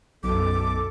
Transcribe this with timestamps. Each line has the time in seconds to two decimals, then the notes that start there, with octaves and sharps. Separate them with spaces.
0.23 B1 F#2 A4 D6